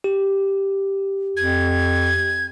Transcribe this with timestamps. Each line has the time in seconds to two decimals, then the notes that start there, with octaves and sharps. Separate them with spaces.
0.04 G4
1.37 F2 G#6